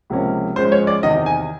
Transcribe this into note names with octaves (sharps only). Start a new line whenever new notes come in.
C#2 C3 F3 A#3 C#4
G#2 F3 G#3 C#4 C5
C#5
D5
E2 C3 D#3 D#5
G#5